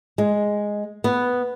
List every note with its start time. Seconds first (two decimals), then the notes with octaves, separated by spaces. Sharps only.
0.18 G#3
1.04 B3